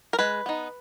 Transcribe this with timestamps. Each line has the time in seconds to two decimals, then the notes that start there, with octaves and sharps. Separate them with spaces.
0.13 A#4
0.19 G#3 B4
0.46 B3 D#4